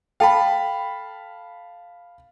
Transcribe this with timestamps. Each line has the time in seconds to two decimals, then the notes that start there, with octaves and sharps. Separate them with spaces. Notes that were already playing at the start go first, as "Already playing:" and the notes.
0.20 A4 F5 G5 A5 B5